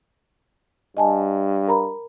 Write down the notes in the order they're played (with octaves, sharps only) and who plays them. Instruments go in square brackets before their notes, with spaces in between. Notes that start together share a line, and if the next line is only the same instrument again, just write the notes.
[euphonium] G2 [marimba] D#5 G#5 A5
[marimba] A#4 A#5 B5